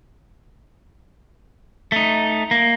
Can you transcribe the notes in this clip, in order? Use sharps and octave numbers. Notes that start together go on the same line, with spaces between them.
A3 D#4
A#3